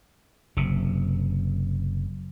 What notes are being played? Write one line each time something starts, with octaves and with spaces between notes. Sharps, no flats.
F#1 C3